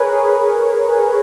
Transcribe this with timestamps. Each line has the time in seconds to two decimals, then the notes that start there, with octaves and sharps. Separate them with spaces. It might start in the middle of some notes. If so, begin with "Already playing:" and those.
Already playing: G#4 A#4 B4 C#5
0.13 G#4 B4